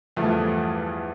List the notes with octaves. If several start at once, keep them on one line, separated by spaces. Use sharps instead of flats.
E2 G2 E3 F3 A3